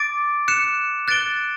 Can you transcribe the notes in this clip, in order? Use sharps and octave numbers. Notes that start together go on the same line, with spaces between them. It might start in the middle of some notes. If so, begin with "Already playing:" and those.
Already playing: D6 A6 D7
F#6 C#7 E7
F#6 A6 D7 G7